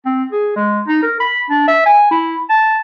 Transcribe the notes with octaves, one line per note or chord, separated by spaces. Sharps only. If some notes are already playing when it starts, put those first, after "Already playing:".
C4
G#4
G#3
D#4
A#4
B5
D4
E5
G#5
E4
A5